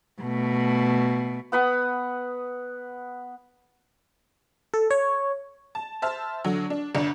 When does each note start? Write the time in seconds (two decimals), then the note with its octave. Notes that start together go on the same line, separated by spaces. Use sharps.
0.21 B2 A3
1.52 B3 F#5 B5 D#6
4.74 A4
4.90 C#5
5.75 A5
6.02 C5 E5 A5 F6
6.45 D3 F#3
6.70 D4
6.95 G1 D2 D4